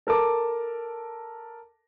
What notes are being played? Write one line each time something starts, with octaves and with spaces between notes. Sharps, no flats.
A4 A#4 A5 D6